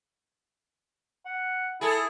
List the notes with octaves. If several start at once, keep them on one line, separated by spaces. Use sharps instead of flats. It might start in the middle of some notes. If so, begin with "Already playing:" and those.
F#5
E4 G#4 A4